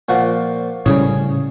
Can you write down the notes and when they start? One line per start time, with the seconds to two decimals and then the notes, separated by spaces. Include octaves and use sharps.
0.09 A#2 F3 F#4
0.86 A2 C#3 G3 C#4 G#4